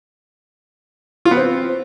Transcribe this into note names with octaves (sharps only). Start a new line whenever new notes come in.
F4
B3
C4